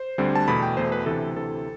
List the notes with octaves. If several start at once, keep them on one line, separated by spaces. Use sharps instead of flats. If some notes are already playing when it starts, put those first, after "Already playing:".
Already playing: C5
D2 D3 G3 C4
A5
E2 B2 A3 B5
G5
E2 B2 A3 C5
B4
D2 C3 E3 A4
D2 C3 E3 A4